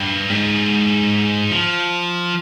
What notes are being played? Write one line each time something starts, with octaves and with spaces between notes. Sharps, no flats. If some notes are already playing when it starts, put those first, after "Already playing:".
Already playing: G2
G#2
F3